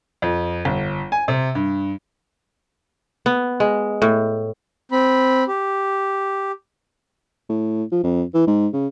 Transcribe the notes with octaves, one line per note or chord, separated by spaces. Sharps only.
F2
G1
G#5
C3
G2
B3
G#3
A2
C4 B5
G4
A2
F3
F2
E3
G#2
C#3